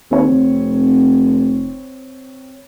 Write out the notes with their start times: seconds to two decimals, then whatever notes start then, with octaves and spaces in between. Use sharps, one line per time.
0.11 D#2 C4 C#5
0.28 F1